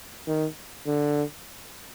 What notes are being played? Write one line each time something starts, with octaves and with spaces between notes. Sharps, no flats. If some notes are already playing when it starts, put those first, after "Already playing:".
D#3
D3